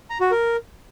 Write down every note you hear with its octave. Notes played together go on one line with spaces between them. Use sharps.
A#5
F#4
A#4